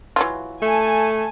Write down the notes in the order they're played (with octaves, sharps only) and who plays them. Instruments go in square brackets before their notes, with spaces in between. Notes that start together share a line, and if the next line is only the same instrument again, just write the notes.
[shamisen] E3 F#3 F4
[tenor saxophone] A3 [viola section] G#5 A5